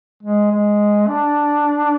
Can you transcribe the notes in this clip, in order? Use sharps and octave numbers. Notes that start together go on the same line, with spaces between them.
G#3
G#3
D4